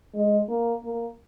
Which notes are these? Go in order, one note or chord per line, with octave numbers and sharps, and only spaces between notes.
G#3
A#3
A#3